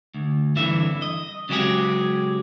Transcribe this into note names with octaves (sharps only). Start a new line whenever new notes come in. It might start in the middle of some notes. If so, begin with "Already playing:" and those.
D2
G2 D3 E3 E5
D#5
C#3 F#3 G#3 E4 G4 G#4